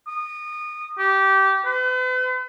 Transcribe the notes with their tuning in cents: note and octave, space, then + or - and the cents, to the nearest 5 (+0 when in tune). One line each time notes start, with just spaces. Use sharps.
D#6 -25
G4 -20
B4 +45